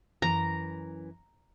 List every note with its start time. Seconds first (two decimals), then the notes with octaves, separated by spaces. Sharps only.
0.22 F#2 E3 A#5